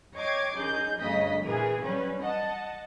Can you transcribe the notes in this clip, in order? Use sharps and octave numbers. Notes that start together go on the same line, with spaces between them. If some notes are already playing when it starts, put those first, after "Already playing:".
C#5 D#5 G5 D6 G#6 C7
F#2 D#4 G#4 G6
D2 G2 C#3 F#3 D#5 B6
A#2 E3 G#4 A#4
F#3 G3 C#4 B4
D#5 F#5 A5